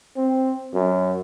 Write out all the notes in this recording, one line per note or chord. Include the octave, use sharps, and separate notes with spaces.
C4
F#2